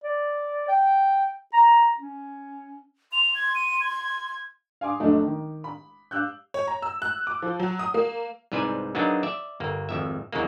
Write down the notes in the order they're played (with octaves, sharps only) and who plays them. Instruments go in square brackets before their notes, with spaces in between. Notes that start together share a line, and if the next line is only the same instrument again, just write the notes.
[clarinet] D5
G5
A#5
C#4
[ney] C6 [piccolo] F7
[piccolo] G#6
D#7
G#6
[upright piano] F5 G#5 C6 D6 D#6
F1 F#3 A3 D4 D#5
D#3
B5
F5 D6 E6 F#6 G6
[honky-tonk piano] C#5
A#5
E6
F#6
D6
F3
F#3
D#6
A#3
[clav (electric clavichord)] C2 G#2 B4 C5 D5 G#5
F#3 A#3 B3 D4 D#4 G#4
D5 E5
G1 A#3
G#1 F2 E5
E2 C#3 F#3 G#3 A#3